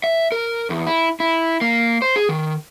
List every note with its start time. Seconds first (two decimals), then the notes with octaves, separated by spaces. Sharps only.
0.04 E5
0.32 A#4
0.70 E2
0.87 E4
1.20 E4
1.61 A#3
2.02 C5
2.16 G#4
2.29 D#3